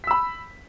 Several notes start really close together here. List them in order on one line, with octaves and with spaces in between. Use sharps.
B6 E6 B5